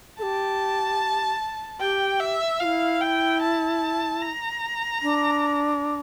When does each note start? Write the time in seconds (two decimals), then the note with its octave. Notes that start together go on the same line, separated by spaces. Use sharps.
0.19 G4 A4 A5
1.80 G4 G5
2.20 E5
2.60 F4 F5
2.64 E4
3.01 G5
3.41 A5
4.22 A#5
5.02 D4